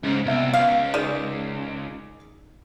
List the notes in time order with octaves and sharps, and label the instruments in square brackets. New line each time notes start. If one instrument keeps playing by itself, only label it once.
[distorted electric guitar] G#2 [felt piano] C#3
[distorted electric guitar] C2 [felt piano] B3 E5
[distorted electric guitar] C#2 [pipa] F5
[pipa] D#3 [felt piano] G#4 D5